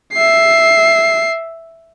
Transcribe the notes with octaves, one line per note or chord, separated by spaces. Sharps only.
E5 C7